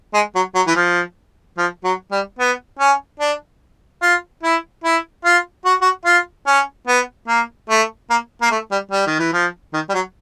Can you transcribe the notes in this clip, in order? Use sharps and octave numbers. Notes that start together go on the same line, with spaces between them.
G#3
F#3
F#3
E3
F3
F3
F#3
G3
B3
C#4
D4
F4
E4
E4
F4
F#4
F#4
F4
C#4
B3
A#3
A3
A#3
A#3
A3
G3
G3
D#3
E3
F3
D#3
G3
F#3